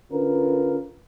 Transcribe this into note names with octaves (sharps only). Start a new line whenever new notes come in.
D3 C#4 F4 A#4 B4